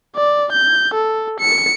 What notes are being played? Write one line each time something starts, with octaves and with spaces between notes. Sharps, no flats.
D5
G6
A4
C#7